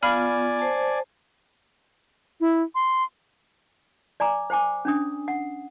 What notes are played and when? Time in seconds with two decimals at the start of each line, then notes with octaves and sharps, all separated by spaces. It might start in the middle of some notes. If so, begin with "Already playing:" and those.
0.03 B3 F4 D5 F5 G#5 B5 F6
0.59 C5 A5
2.41 E4
2.75 C6
4.20 D5 G#5 A#5 D6
4.50 C5 G5 G#5 D6
4.85 C#4 D4 D#6
5.28 F#5